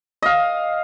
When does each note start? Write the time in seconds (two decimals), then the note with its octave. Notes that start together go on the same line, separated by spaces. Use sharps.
0.22 D#5 F5